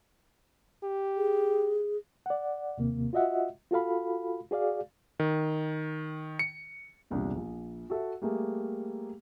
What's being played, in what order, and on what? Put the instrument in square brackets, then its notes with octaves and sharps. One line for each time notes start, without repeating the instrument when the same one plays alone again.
[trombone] G4
[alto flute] G#4
[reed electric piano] D5 F#5
D#2 C3 A#3
F4 F#4 D#5 E5 F#5
F4 F#4 A4 F5 B5
F#4 G#4 D5 F5
[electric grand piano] D#3
C#7
[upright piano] E1 C2 A#2 D4
A#1
F#4 A4 E5
G3 A3 A#3 G#4